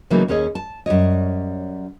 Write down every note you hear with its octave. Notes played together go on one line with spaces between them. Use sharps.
C#3 E3 F#3 A3 A#3 D#4
D#2 C#4 G#4 C#5 D#5
A5
F#2 G3 C#5 D#5